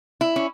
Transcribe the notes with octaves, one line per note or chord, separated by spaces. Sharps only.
E4
C#4